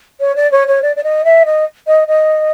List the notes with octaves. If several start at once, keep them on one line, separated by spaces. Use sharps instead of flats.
C#5
D5
C#5
C#5
D5
D5
D#5
E5
D#5
D#5
D#5